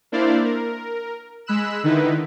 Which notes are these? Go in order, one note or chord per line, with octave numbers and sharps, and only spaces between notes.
A#3 D4 E4 C5 D5 F5
A#4
G#3 B5 E6 F#6 E7
D3 D#3 D#4 E4 B4